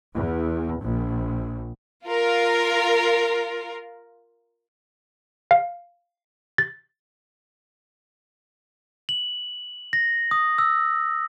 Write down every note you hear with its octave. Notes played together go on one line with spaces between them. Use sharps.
E2
A#1
F4 A#4
F5
A6
F#7
A#6
D#6
E6